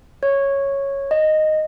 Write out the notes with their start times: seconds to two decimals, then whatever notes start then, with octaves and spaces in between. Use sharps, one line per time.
0.23 C#5
1.11 D#5